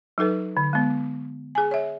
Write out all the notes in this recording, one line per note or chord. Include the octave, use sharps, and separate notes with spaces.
F#3 D#4 A4 B4
D3
G#3 B3
G#4 G#5
C#5 E5